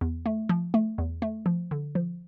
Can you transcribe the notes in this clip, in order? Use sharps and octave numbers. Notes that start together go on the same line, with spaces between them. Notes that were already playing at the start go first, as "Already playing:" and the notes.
E2
A3
F3
A3
E2
A3
F3
D3
F3